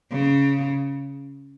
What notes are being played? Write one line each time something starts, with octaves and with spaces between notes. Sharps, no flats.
C#3